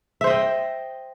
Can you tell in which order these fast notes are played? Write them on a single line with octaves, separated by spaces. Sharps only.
E5 C5 D#5 G5